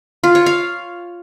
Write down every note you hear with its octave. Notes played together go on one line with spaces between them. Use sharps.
F4
C#5
F5